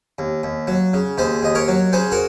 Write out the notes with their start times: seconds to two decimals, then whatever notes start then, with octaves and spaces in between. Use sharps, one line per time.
0.19 D#2
0.43 D#2
0.68 F#3
0.93 C#3
1.18 D#2 G#4 C5
1.43 D#2 D#5
1.55 A#4 C#5
1.68 F#3
1.93 C#3 G#4 C5
2.12 F#4 A#4